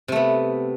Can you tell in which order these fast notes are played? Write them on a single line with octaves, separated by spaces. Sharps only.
C3 A3 B3